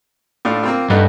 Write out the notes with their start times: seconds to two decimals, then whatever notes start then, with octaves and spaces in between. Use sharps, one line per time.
0.45 A2 D4 F4
0.63 A#3 C4 F4
0.90 G2 A3 D#4 F#5